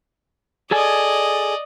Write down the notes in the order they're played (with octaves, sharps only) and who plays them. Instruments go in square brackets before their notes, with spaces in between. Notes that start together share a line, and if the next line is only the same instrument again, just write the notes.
[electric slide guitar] G#4 A4 G#5 [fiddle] D5 D#5